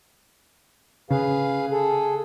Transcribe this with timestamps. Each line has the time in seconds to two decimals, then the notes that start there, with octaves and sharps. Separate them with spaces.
1.10 C#3 G#4 B4 F5
1.72 G#4 A4